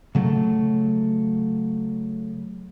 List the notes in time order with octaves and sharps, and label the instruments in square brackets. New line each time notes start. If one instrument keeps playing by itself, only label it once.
[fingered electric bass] C#3 F#3 A3